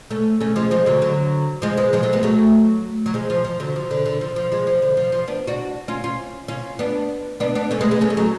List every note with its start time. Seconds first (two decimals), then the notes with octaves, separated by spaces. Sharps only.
0.11 A3 C#4
0.41 A3 C#4
0.56 F3 G#3
0.71 F3 G#3
0.86 D3 F#3
1.02 D3 F#3
1.62 F3 G#3
1.77 G#3 B3
1.93 F3 G#3
2.03 F#3 A3
2.13 G#3 B3
2.23 F#3 A3
3.06 F#3
3.14 F3 G#3
3.30 F3
3.44 F3
3.60 D3 F#3
3.76 F3
3.91 D3
4.06 D3
4.21 F3
4.36 F3
4.52 F3 G#3
4.67 F3
4.82 D3
4.97 F3
5.12 F3
5.28 B3 D4
5.47 D4 F#4
5.88 C#4 F4
6.04 C#4 F4
6.48 C#4 F4
6.79 B3 D4
7.40 B3 D4
7.55 B3 D4
7.71 A3 C#4
7.81 G#3 B3
7.91 G#3 B3
8.01 A3 C#4
8.10 G#3
8.17 F#3 A3